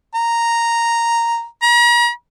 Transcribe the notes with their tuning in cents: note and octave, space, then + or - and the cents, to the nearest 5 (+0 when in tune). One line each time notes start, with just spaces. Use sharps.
A#5 -5
A#5 +40